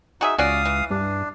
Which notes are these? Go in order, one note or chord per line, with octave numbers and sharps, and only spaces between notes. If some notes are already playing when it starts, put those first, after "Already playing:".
D#4 F#4 G#4 E5
C#2 C#4 F#4 D5 F5 D#6
E3
G2 D4